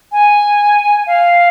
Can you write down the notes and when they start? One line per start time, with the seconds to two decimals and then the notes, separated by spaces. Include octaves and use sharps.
0.12 G#5
1.07 F5